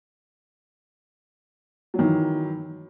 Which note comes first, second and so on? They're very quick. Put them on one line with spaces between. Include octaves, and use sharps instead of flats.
F#3 D#3 E3